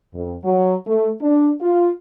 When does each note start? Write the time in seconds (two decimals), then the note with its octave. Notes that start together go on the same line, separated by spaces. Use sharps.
0.14 F2
0.44 F#3
0.87 A3
1.21 D4
1.61 F4